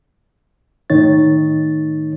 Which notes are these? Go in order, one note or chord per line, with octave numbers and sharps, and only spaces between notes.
A2 D#3 D#4 C#5 A6